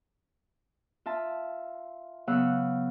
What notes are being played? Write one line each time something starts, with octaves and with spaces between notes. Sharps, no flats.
F4 E5 A5
C#3 F#3 B3 F5 F#5 E6